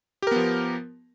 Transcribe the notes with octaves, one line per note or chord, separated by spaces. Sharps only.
F3 B3 G4 A#4